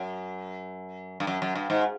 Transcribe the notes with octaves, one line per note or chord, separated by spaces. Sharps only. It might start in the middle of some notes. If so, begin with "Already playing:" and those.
Already playing: F#2
G2
F#2
F#2
G2
G#2